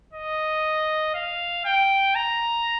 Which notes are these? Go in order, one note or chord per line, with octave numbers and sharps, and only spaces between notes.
D#5
F5
G5
A#5